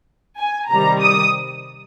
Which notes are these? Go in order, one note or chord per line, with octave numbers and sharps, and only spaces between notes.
G#5
C3 D#3 G3 A#5
D#6